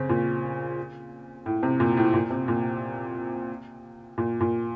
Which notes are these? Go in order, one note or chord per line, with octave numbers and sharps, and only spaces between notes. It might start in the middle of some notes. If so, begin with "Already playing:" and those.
Already playing: C#3 C4 C#4
A#2
A2
C3
A#2
A2
A#2
C3
A#2
A#2
A#2